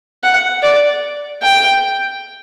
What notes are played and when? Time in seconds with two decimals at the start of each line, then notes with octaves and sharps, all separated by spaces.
0.23 F#5
0.63 D5
1.43 G5